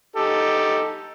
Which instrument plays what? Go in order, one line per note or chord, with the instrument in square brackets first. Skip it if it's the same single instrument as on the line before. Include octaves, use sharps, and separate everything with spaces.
[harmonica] D#4 G4 A4